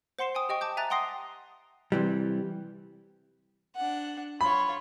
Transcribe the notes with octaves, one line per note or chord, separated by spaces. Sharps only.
C5 F#5 C6 C7 E7
G5 G#5 D#6
G4 D#5 G5 C#6
A5 D6 G6
E5 G#5 A#5 F#6 A6
F#5 G5 C6 D#6 A#6 C7
C3 E3 G3
D4 F#5
F4 C#5 B5